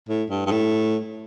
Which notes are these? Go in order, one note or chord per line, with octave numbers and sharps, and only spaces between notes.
A2
G2
G2
A2